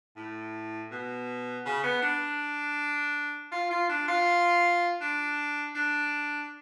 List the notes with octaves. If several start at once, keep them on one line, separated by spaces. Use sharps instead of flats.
A2
B2
C#3
B3
D4
F4
F4
D4
F4
D4
D4